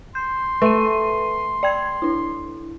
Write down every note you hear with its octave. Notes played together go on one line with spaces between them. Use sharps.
C6 G6
A3 B4 D#7
D5 G5 G#6
D4 E4